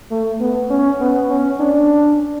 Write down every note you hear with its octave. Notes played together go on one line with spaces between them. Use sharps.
A3
B3
C#4
B3
C#4
D4